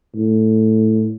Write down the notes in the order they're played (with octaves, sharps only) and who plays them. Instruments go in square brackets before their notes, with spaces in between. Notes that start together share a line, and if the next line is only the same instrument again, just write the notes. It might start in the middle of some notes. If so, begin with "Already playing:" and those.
[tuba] A2